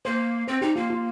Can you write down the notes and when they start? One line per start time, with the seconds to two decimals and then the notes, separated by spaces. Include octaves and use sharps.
0.05 A#3 C5
0.47 C4 C5
0.62 D#4 G4
0.76 A#3 F4
0.90 F4